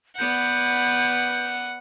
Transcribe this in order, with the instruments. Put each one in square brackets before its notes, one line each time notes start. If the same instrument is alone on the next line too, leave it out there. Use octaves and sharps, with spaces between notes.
[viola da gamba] B3 B4 D5 [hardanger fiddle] F#5 [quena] G6